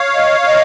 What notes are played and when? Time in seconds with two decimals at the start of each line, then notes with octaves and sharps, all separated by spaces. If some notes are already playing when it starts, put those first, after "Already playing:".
Already playing: C#5 F5
0.15 D#5
0.46 D#5